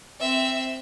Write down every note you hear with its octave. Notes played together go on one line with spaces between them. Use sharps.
C4 E5